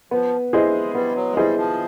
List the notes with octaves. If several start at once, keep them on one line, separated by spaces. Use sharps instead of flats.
F3 B3
E4 G#4 C5 D#5
G#3
G3 B3
F#3
G#3
G3 E4 G#4 C5 D#5
F3